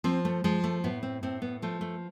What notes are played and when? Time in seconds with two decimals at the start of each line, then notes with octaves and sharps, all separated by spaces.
0.04 F3 C4
0.25 A3
0.44 F3 G#3
0.64 A3
0.84 A2 B3
1.03 C4
1.23 A2 C4
1.42 B3
1.62 F3 A3
1.81 A3